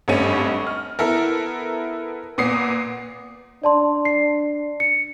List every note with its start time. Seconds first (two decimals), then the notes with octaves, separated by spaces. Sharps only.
0.08 G#1 G2 A3 C#4 D#7
0.67 F6
0.99 B3 E4 A4 A#4
2.38 A#2 B3 D#6 C7
3.64 D4 D5 A5 C6
4.05 C7
4.80 C#7